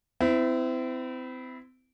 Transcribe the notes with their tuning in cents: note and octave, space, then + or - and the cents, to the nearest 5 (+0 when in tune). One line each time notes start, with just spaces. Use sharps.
C4 -35 E4 +0